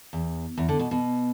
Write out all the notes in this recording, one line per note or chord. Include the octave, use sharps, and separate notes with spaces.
E2
E2
D3
B2
B2